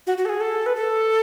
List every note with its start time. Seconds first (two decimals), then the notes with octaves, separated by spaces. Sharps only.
0.07 F#4
0.18 F#4
0.25 A4
0.29 G#4
0.41 A4
0.66 B4
0.75 A4